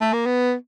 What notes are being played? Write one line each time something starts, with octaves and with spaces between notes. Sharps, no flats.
A3
A#3
B3